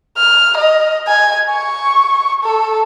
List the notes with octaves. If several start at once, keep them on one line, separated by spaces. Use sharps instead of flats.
F6
D#5
G#5
C#6
A4